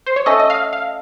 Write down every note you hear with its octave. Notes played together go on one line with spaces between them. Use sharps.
C5
C#5
A3 C#4 A4 D#5
D#5
F5
F5